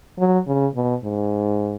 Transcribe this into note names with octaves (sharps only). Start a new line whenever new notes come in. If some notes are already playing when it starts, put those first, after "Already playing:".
F#3
C#3
B2
G#2